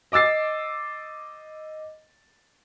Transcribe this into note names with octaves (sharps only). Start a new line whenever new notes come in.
D#5 D6 E6 A6 C7